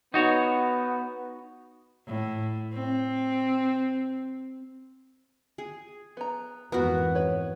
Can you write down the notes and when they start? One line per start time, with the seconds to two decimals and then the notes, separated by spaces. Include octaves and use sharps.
0.14 B3 D#4 F#4 C#5
2.07 A2
2.73 C4
5.58 G#4
6.17 B3 A#5
6.72 F2 G#2 E3 B3 F#4 A#4
7.15 B4 C#5